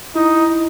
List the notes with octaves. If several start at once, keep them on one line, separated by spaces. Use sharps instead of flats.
D#4 E4
E4